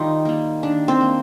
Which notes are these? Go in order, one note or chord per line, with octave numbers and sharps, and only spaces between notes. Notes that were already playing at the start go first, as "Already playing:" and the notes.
Already playing: D#3 G3 D#4 F4 G4
G3 A#3
D#3 D4
C4
A#3